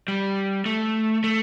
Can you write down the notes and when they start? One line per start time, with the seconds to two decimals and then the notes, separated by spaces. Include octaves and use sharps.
0.08 G3
0.66 A3
1.24 A3